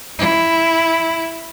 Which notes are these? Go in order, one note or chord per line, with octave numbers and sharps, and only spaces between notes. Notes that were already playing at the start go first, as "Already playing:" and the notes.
E4